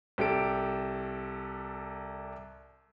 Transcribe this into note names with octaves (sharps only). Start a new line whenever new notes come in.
C2 G4 A4 D7